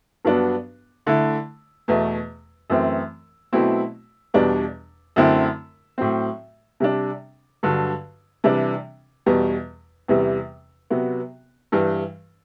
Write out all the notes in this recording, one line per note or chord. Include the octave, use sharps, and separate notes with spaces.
G2 F#3 B3 D4
D3 A3 E4
E2 B2 A3
F#2 E3 A3 C4
B2 F#3 A3 C4 E4
E2 B2 G3 D4
F#2 D3 A3 C4 E4
A2 F#3 C4
C3 G3 D4
G2 D3 F#3
C3 E3 G3 D4
E2 B2 G3
E2 C3 E3 G3
C3 F#3 B3
G2 E3 G3